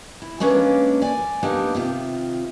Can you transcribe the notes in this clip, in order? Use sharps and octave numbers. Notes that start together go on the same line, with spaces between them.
E4
G#3 A#3 C#4 D4 B4 F5
D5 G#5
A#3 B3 D4 D#4 G4
C3 D#3 F4